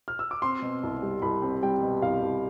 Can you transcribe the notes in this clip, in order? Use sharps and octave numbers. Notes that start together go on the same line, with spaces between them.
F6
E6
D6
C4 C6
B2
C2
G3
C2 B5
C4
G3 G5
B2
C2 F5
C2